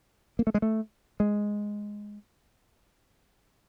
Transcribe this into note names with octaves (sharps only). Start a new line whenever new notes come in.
A#3
A3
G#3
A3
G#3